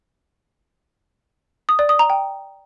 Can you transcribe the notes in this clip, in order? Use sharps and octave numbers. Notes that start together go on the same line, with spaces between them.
D#6
D5
D#6
A#5
G5